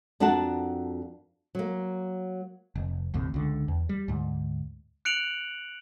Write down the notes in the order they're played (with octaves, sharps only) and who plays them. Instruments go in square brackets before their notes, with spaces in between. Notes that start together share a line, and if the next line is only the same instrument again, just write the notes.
[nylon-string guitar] F2 D4 F#4 A#4 F#5 A5
F#3 A#3
[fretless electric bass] F1
G1 D#2 A2 C3
C#2 D3
E2
G3
D2 G#2
[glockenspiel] F#6 C#7 D7 F7 F#7